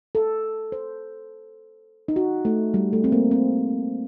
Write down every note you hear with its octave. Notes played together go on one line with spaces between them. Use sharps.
A4
C5
D#4
F#4
A3
G3
A3
C4
A#3
C4